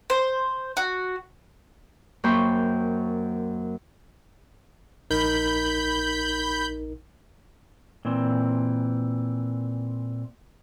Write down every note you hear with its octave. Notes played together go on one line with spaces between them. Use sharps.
C5
F#4
F#2 A#3 C5 G5 B5 C#6
A#1 D#4 A#4 B5 G6
A#2 E3 C4